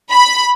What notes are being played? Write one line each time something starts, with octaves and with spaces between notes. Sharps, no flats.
B5